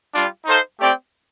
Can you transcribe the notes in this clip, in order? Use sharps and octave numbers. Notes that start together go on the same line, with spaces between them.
G3 D4 F4
D#4 A4 C5 F5
A3 C4 G4 D5 G5